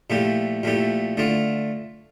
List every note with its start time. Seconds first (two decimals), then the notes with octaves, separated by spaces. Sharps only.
0.10 A#2 F3 A3 E4 G4
0.63 A#2 F3 A3 E4 G4
1.17 D3 A3 D4 F4